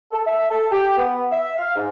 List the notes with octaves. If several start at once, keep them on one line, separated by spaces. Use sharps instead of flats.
A4
E5
A4
G4
B3
E5
F5
G#2